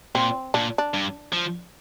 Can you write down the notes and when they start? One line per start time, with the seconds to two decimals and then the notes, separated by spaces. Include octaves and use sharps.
0.15 A#2 C4
0.54 A#2 D4
0.78 D4
0.94 G2
1.33 F3